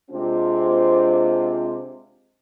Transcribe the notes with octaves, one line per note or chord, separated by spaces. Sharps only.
C3 G#3 C4 D4 F4